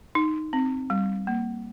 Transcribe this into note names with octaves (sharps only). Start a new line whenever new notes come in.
D#4
C4
G3
A#3